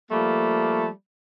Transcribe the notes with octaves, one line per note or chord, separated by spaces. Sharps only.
F3 G3 A3 A#3